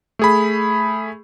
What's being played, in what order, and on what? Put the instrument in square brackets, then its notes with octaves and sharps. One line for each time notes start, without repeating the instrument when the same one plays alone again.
[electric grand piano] A3 G#4 B5